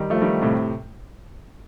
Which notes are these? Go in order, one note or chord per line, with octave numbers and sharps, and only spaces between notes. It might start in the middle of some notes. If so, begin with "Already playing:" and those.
Already playing: D#3 G3
F3 A3
D#3 G3
A2 C3